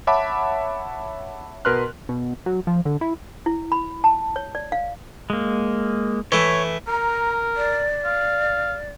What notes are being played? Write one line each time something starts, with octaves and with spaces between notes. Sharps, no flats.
C#5 E5 F#5 A5 B5 D6
B2 A#4 B4 C6 F6 F#6
B2
F#3
F3
D3
E4
E4
B5
A5
C#5
D5
F5
G#3 A#3
E3 A3 C#5
A#4 A#5
D5
F5